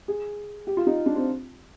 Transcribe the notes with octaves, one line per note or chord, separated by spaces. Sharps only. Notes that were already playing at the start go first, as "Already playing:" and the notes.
G#4
G4
F4
D#4
D4
C4